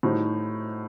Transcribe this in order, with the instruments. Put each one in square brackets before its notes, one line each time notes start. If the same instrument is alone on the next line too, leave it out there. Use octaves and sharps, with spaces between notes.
[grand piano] A2 [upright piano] D#3 G3 D#4 F#4 C5